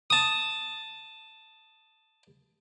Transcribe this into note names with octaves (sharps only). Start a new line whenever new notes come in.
A5 D#6